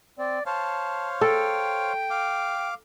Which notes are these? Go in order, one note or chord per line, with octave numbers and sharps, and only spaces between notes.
C4 D5
C5 C#5 F5 A5
A4 G5
F5 D6